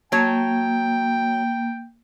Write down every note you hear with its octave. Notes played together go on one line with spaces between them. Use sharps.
F#3 A#3 C#5 G5 A5